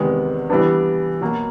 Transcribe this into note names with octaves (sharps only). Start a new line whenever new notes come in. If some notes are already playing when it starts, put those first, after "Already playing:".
Already playing: E2 C3 D#3 G#3 B3
E3 G3 B3 D4
B2 F#3 A#3